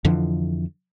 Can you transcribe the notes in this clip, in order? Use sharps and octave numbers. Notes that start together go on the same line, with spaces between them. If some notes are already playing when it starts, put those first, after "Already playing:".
F2 D3 E3 F3